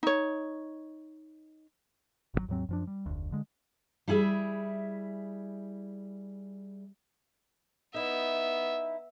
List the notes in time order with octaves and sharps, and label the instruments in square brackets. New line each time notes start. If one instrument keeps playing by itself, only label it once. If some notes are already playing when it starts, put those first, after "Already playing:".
[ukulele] D#4 C#5
[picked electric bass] G#1 B2 F#3
D#2 G#2 F#3 C4
F#2 F3 D4
G3
F1 D2
D3 G#3
[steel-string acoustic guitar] G3 E4 G#4 E5
[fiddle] B3 E5 [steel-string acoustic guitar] D#4 E4